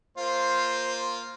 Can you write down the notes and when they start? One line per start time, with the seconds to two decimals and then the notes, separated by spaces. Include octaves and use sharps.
0.17 A#3 F4 C5